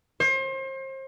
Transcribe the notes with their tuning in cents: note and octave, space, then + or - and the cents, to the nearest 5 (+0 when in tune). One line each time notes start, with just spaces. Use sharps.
C5 +35